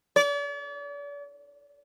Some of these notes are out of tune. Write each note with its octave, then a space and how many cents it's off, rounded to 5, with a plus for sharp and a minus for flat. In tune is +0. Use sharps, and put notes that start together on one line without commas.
D5 -40